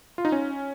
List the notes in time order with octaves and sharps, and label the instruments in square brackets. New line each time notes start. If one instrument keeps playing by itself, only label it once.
[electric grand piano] F4
D#4
C#4